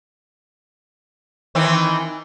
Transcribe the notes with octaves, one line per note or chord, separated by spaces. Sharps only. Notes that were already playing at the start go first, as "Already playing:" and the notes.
D#3 E3 C4